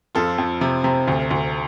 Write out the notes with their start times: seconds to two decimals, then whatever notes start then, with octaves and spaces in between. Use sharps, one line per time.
0.15 F2 F4 A4
0.38 F2
0.61 C3
0.84 C3
1.08 D2
1.31 D2